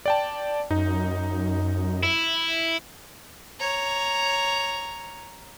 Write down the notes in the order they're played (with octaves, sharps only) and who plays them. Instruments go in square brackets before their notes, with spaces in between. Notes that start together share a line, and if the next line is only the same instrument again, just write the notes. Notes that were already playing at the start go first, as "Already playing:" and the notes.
[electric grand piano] D5 G5 A5
[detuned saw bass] F#2 [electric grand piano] D#4
[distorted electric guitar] E4
[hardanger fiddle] C#5 A#5